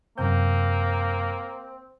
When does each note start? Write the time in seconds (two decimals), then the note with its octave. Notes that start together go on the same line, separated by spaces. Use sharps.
0.18 F#2 C3 A#3 C4 G6